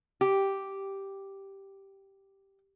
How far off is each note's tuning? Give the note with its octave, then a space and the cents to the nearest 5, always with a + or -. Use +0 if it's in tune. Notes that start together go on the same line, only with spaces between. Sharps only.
G4 -5